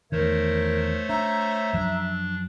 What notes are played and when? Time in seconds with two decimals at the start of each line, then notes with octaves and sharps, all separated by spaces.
0.12 E2 D#3 A3 A#4 C5 C#5
1.09 D4 E5 A#5
1.73 F#2 F3 F#3 D4